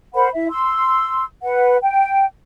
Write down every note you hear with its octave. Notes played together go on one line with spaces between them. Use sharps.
A#4 C5 F#5 B5
E4 E5
C6 E6
B4 F#5
G5